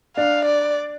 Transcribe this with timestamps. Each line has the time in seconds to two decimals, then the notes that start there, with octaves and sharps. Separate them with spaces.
0.17 D4 F5
0.45 D5